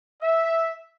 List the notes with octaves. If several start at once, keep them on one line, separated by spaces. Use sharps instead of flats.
E5